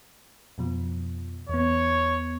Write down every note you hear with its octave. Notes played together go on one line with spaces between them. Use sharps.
F2 B2 F3
E2 B3 C#5